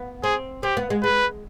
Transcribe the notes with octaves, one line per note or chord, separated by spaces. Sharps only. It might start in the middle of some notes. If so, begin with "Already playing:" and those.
Already playing: B3
C4 G#4
C4 G4
B3
G#3
G#3 B4